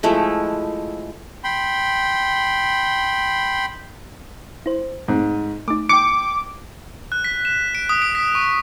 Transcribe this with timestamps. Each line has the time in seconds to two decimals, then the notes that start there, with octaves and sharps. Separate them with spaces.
0.03 F3 G#3 A3 E4
1.44 G5 B5 C6
4.66 E4 C5
5.08 G#2 G#3 A3 C4
5.68 A3 D#4 D6
5.89 G5 D6 C#7
7.12 F#6
7.24 B6
7.45 E7
7.75 D7
7.89 D#6
8.02 D7
8.15 B6
8.35 C#6